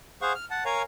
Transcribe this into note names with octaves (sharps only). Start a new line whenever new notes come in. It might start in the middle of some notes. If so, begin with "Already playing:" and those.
G#4 C5 F5 F#5 C#6
F6
F#5 A5
A#4 C#5 F5 G#5 A#5